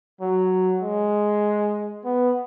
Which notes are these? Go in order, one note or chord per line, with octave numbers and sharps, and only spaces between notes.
F#3
G#3
B3